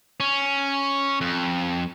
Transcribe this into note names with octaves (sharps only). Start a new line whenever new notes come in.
C#4
F2